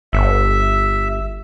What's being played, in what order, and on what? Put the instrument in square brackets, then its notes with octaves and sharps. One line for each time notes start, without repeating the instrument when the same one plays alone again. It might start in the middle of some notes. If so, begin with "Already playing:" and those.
[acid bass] G1 [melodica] E5